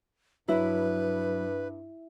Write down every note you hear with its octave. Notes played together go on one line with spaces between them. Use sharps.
G2 F#3 E4 B4